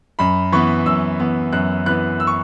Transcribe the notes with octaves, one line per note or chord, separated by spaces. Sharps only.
F#2 B5
E3 B3 C#6
F#2 E6
E3 B3
F#2 F#6
E3 B3 F#6
E6
C#6